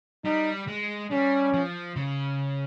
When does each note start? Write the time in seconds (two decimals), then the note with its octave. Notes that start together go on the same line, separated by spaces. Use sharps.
0.25 G3 D#4
0.67 G#3
1.11 G3 C#4
1.54 F3
1.96 C#3